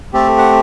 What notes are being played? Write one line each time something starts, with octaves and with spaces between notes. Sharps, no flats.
A3 C4 G4 A4
F#5